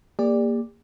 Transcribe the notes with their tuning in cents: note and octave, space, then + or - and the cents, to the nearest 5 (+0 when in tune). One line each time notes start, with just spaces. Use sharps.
A#3 +0 G4 +45 D5 +0